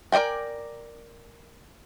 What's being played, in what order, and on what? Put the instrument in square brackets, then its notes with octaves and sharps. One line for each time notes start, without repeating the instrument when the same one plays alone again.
[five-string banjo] A#4 D5 D#5 G5 G#5